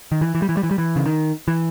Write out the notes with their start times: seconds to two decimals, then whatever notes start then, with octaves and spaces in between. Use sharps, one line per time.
0.12 D#3
0.21 E3
0.35 E3
0.42 G3
0.49 E3
0.57 G3
0.63 E3
0.71 G3
0.78 E3
0.96 C#3
1.06 D#3
1.48 E3